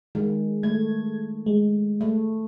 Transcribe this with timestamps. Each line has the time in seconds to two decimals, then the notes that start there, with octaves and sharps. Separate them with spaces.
0.15 D#3 G#3
0.63 A3 G#6
1.46 G#3
2.01 A3